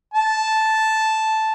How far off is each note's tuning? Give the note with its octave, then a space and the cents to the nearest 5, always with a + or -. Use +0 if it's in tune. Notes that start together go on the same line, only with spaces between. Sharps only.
A5 -5